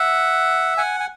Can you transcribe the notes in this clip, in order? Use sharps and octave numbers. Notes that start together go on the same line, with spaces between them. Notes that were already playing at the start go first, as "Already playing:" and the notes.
Already playing: E5 F#5
F#5 G#5
G#5